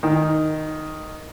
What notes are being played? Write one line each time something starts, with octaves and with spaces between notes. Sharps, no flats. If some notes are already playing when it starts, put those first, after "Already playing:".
D#3